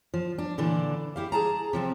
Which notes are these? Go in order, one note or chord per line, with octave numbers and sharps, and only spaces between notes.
F3
D4
A#2 D3 E3 D4
E4 G4 F5
G#4 A5 A#5
C3 F3 C4